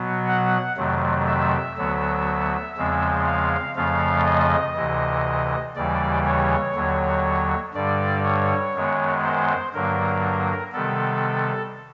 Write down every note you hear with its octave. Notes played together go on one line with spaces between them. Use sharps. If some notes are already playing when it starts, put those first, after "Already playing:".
Already playing: B2 F#3 B3
F#5
F2 C3 D#3 F#3 A3
E5
D2 D3 F#3 B3
E2 C#3 F3 G#3 C4
F5
F2 C#3 F3 A3 F5
D#5
D2 C3 E3
D#2 C#3 E3 G3 D5
C#5
D#2 D3 F#3
G2 D3 G3 D5
C#5
F#2 D#3 G#3 B3
C5
G2 D3 F#3 A#3 A#4
C3 D#3 G3 B3 A4